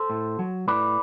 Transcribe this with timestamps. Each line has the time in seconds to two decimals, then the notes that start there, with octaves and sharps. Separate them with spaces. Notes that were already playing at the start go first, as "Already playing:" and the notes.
Already playing: A4 C5
0.10 A2
0.39 F#3
0.68 A2 B4 D5